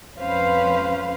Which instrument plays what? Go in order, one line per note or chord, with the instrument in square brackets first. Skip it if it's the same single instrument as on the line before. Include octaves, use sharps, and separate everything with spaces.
[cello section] F2 C#4 B4 C5 F5